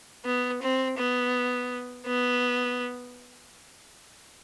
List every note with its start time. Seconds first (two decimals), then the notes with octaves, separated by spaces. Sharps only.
0.25 B3
0.62 C4
0.98 B3
2.06 B3